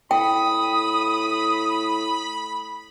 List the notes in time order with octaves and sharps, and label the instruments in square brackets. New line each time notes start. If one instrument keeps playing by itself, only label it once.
[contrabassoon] A2 [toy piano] G5 [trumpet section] B5 [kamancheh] D#6